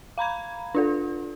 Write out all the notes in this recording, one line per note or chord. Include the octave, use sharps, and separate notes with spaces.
F5 A#5 B5 G#6
D4 F4 A4